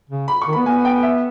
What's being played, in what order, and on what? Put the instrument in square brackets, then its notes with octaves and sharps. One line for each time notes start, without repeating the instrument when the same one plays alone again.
[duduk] C#3
[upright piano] B5
C#6
[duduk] D#3
[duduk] B3 [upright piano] B5
[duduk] B3 [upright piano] G#5
[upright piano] G5
E5